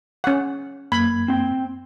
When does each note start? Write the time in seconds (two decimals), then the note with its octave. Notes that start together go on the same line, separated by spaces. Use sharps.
0.24 C#4 F#5
0.92 F#2 A#3 B5 G#6
1.28 C4 G5